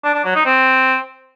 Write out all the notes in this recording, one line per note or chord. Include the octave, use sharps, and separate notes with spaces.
D4
D4
F#3
D#4
C4